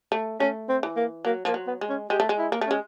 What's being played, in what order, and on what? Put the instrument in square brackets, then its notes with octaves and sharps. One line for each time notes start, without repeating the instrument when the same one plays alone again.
[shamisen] A3
[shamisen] A3 [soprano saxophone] C#4
[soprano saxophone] C4
[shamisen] E3
[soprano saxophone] A#3
[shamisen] F#3 [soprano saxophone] A#3
[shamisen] F3 [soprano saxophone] A#3
[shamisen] F#3
[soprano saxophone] B3
[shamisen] G#3
[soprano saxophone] C#4
[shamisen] G#3 [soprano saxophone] G4
[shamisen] A3
G#3
[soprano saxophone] E4
[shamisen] A#3
A3
[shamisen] G#3 [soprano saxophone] C#4